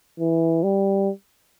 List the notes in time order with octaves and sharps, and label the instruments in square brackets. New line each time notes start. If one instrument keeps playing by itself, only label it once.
[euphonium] E3
G3